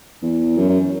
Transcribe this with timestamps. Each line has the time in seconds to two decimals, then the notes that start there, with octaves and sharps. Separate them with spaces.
0.22 E2
0.57 F#2
0.69 F#2